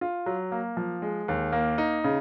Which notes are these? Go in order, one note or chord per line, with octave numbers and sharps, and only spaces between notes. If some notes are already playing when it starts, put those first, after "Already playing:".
F4
F#3
A#3
F3
G#3
D#2
A#3
D#4
C#3